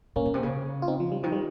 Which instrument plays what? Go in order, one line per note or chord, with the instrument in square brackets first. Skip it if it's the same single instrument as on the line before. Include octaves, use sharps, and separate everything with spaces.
[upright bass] A#2 [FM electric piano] A#3 C#4
[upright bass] A#2
C3
C#3
[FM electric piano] F4
C4 D#4
F3
G3
[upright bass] D#3 [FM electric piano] F3
[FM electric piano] G3